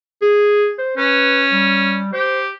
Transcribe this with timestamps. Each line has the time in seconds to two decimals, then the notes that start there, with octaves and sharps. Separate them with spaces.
0.22 G#4
0.78 C5
0.97 C#4 B4
1.51 G3
2.13 G4 C5